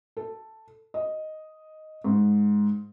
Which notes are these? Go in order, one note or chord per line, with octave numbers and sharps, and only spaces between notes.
A4
D#5
G#2